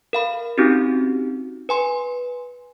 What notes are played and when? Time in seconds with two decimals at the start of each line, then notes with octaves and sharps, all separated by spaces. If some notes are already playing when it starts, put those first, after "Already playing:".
0.13 A#4 F5 B5
0.58 C4 C#4 D#4 F#4 G4
1.69 B4 G#5 C6